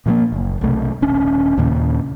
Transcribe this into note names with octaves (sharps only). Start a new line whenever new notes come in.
A#2 F3 A3 A#3
F#1
B1 C3 A3
D#1 C#4 D4
D#2 A#2 C#3